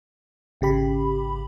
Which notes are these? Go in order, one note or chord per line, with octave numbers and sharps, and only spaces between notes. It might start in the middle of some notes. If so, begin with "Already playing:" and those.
G#1 C#3 G4 B5